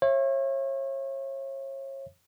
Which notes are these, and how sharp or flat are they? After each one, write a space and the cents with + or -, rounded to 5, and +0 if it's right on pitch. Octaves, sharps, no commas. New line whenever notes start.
C#5 -35 E5 +25